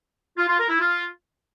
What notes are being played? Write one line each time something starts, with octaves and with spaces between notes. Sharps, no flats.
F4
F4
A#4
E4
F4